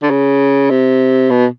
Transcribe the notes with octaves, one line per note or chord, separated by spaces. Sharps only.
D3
C#3
C3
B2